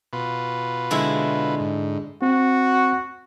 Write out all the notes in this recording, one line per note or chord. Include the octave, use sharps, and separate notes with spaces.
B2 F4 B4
D3 G#3 E4
G#2
C4 F#4